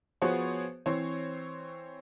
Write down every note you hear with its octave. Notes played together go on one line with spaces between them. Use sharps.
F3 B3 F#4 G#4 C5 C#5
E3 C4 C5 C#5